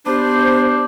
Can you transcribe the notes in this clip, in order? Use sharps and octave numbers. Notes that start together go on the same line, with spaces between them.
B3 D4 G4 C5